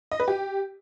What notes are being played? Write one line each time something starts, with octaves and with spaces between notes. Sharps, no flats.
D#5
B4
G4